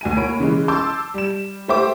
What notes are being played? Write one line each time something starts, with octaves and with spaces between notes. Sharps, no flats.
D2 G#5 D#7
A#3 C#5 B5 D7
C#3 E3 G#3
A5 C6 D6 E6 G6
G3 E7
A3 G4 C5 E5 D6